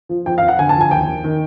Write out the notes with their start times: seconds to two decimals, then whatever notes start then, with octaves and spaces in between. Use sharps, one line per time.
0.09 F3
0.26 F2 G5
0.38 F2 F5
0.48 F#5
0.59 D3 G#5
0.69 A5
0.76 F2 G#5
0.91 D#2 G5
1.07 D#3
1.24 D#3